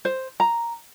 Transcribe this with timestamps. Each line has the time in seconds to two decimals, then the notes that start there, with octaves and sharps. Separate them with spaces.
0.05 C5
0.40 A#5